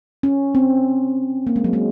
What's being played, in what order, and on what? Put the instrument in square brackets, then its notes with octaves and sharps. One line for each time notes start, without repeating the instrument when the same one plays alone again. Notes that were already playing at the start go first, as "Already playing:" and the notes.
[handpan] C#4
C4
A#3
G#3
F#3
G#3